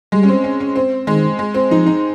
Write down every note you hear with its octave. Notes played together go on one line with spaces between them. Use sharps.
G3 G#3
C#4
C4
C#4
C#4
C4
D#3 G#3
G#3
C4
F3 D#4
D#4